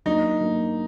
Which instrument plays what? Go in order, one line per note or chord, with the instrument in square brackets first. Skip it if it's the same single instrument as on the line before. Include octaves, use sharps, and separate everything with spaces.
[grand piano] F#3 A#3 D4 [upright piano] D#4
[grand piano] F#3 A#3 D4